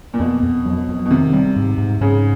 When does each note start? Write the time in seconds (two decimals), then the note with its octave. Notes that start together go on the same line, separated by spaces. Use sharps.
0.14 A#2
0.19 F2 B2
0.43 F2
0.66 F#3
0.88 F2
1.05 B2
1.10 C3 D#3
1.33 G3
1.56 G#2
1.78 G#2
2.01 G#2 C#3